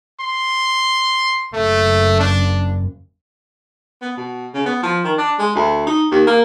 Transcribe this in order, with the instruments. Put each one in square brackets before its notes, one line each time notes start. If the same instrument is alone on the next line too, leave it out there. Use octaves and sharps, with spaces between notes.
[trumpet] C6
[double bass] F#1 [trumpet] A3
[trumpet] D4
[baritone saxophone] B3
B2
C#3
B3
F3
D#3
D4
G#3
D2
D#4
D#2
A#3